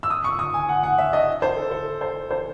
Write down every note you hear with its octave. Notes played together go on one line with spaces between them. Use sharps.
E6
D#6
C#6
D#6
G#5
F#5
F#5
E5
D#5
C5
A4
A4
C5
C5